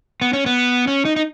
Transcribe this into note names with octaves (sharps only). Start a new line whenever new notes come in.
B3
C#4
B3
C#4
D#4
D#4